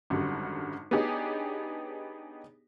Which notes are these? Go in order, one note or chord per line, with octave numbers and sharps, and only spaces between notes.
G#1 F#2 D3 G3
B3 D4 D#4 G4 G#4 C#5